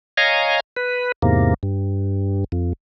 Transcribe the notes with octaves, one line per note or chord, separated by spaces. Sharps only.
C#5 D#5 F5 G#5 A#5
B4
E2 G#2 C3 A#3
G2
F2